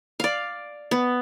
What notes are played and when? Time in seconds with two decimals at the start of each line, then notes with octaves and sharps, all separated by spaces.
0.20 D5 F5
0.91 B3